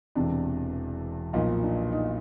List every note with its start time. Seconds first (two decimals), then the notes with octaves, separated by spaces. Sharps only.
0.15 E1 E2 C3 D4
1.33 B1 A#2 F3 A#3 D#4
1.63 D4
1.92 D#4